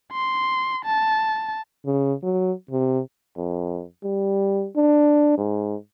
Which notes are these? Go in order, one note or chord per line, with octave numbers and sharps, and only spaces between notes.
C6
A5
C#3
F#3
C3
F2
G3
D4
G#2